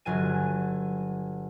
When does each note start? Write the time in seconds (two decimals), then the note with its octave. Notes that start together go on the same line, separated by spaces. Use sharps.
0.05 G1 F#3 F4 G#5 D#7